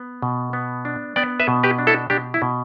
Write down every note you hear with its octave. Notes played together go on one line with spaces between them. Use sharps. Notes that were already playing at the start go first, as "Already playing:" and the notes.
Already playing: B3
B2
B3
D4
B3 D5 G5
B4 E5
B2
G4 B4
D4
E4 A4
B2 D4 G4
E4
B2